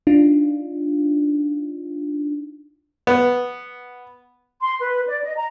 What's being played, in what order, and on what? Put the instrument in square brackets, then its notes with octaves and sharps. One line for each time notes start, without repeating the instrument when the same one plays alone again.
[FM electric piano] D4 D#4 F4
[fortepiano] B3
[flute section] C6
B4
D5
D#5
A#5